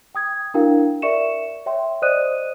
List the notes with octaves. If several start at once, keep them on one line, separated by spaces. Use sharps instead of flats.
G5 D#6 G#6
D4 E4 F#4 A#4 F5 G5
A#4 D5 E5 C#6 C#7 E7
C#5 E5 G5 C6
C5 D5 D#5 D#6 F#6 D#7